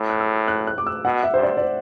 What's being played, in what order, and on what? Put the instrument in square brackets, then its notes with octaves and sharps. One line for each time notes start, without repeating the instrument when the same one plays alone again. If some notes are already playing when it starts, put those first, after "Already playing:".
Already playing: [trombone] A2 [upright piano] E6
[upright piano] F#6
E6
F#6
F#6
D6
E6
[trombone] B2 [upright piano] F#5
[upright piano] E5
[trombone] G2 [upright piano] C5
[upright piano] D5
D5
C5